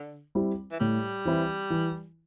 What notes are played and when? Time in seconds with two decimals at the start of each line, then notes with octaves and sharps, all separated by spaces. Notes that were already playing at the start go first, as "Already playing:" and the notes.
Already playing: D3
0.35 G3 C4 E4
0.72 E3
0.80 A2 G3
1.25 E3 C4 E4
1.70 E3